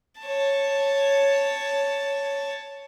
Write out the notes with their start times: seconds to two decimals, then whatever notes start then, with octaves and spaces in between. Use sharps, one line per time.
0.21 C#5 A5